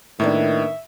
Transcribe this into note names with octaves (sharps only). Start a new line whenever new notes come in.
A2 D#3 A#3 B3 D4 E5